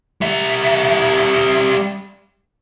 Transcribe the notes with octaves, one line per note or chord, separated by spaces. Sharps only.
G3 E5